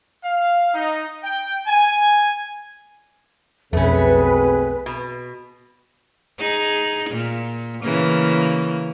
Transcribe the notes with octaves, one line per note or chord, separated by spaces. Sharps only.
F5
D#4
G5
G#5
B1 F2 B2 A3 C4 C#4 G#4 B4
B2
D#4 G#4
A#2
C#3 E3 A#3